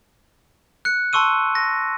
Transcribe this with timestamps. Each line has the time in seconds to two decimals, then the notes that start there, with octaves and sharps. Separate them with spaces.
0.85 F#6 C#7
1.13 A5 C6 C#6 E6 D#7
1.55 A#6